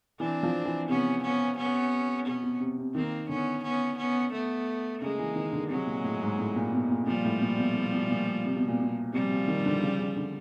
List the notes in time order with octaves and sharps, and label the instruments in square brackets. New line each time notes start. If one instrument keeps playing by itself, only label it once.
[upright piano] E3 [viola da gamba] C4 D4
[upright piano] F3
E3
[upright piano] C3 [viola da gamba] B3 C#4
[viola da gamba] B3 C#4
B3 C#4
[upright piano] B2 [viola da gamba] B3 C#4
[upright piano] B2
C3
C3
[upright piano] D#3 [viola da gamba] A#3 C4
[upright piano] D3 [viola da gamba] B3 C#4
[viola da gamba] B3 C#4
B3 C#4
A3 B3
[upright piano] C#3 [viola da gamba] G#3 A#3
[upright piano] E3
D#3
D3
[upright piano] C3 [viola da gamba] F#3 G#3
[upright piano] A#2
A2
G#2
A2
A#2
B2
A#2
[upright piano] A#2 [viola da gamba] F3 G3
[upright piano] A2
A#2
B2
B2
B2
A#2
C3
B2
A#2
B2
[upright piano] C3 [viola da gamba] F3 G3
[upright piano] C3
D#3
D3
C#3
C#3
D3